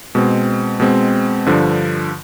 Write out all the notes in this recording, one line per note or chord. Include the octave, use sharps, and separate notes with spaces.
B2 G#3 C4
B2 G#3 C4
G2 D3 F3